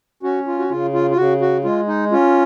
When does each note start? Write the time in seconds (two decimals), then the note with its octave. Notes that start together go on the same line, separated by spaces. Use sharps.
0.23 C#4 F#4
0.47 F4
0.59 F#4
0.70 C#3 F4
0.94 F4
1.10 F4
1.17 C#3 F#4
1.41 F#4
1.64 G#3 F4
1.88 D#4
2.12 C#4 F4